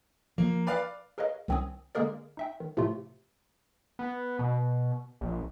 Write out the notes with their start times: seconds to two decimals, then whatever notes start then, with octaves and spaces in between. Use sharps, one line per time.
0.38 F3 A#3
0.67 B4 D5 F5
1.18 G#4 A#4 B4 C#5 D#5 F5
1.48 C2 D#3 C4 C#4 G#5 D#6
1.95 D3 G#3 A#3 G#4 A#4 D5
2.37 D#4 E5 G5
2.60 D#3
2.77 A2 C3 F3 A3 F4
3.99 B3
4.39 B2
5.21 A#1